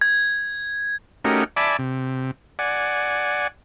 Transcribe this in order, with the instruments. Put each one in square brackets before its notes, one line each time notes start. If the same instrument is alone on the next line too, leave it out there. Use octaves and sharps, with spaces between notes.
[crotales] G#6
[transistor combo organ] A3 C#4 D#4 F#4 G4 A#4
D5 E5 G#5 A5 B5 D6
C3
D5 F#5 G#5